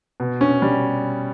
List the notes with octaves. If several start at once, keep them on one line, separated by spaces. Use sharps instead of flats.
B2
C#4
G3